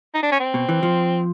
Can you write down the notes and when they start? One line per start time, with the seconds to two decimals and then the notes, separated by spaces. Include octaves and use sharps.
0.15 D#4
0.23 D4
0.32 C#4
0.40 C4
0.54 B2
0.69 E3
0.83 F3